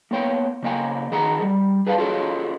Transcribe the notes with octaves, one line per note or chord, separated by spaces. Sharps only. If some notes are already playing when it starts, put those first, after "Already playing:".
A#3 B3 C#5 G5
C#3 A#3 D#5 G5 G#5
D#3 G#4 D#5 F#5 A#5
G3
G#4 B4 D5 F5 G#5 A5
F4 F#4 G#4 A4 C#5 D#5